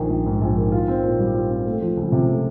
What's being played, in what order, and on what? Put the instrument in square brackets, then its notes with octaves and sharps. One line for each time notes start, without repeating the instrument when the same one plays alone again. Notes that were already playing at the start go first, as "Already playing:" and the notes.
Already playing: [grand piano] A#1 D#3
A#1
G#2
A#1
D#3
F4
C4
A#2
G3
F4
C4
A3
F3
C#2
C3
A3